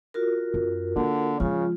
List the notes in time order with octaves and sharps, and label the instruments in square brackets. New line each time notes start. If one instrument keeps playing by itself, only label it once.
[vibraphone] F4 F#4 A#4
[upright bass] F#2
[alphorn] D3 [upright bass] A#3
[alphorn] C#3 [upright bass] F3 G#3 [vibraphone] F4